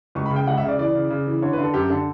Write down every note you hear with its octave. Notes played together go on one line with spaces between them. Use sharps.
C#2 C#6
B5
C#3
G5
C#2 F#5
E5
C#3
D5
E3 D5
C#3
C#3
E3
D3 C#5
B4
D3 A4
F#2 G4
D3 A4